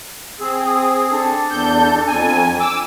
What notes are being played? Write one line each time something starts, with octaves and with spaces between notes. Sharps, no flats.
C4 G#4 E6
D#6
D4 A4
E2 G6
F2 G#5
D6 E6